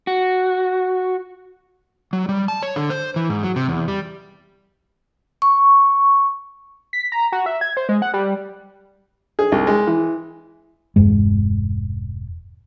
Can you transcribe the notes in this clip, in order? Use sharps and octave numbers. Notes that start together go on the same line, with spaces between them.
F#4
F#3
G3
A5
C#5
D3
C5
E3
G#2
F#3
C3
E2
G3
C#6
B6
A#5
F#4
E5
G#6
C5
G#3
F#5
G3
G#4
C2
G#3
E3
E1 G2 G#3